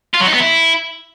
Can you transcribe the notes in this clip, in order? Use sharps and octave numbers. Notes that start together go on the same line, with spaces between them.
F4
F#3
D#4
B3
E4